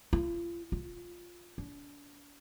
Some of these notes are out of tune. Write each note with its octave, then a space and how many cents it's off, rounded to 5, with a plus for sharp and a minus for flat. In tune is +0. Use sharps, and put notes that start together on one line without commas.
F4 -35
F4 +5
D4 -40